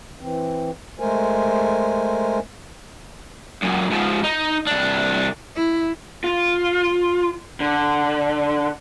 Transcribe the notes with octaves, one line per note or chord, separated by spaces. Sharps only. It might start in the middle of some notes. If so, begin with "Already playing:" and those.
E3 C4
G#3 A3 A#4 C5 G#5
F#2 A#2
G#2 F3
D#4
C2 D4
E4
F4
D3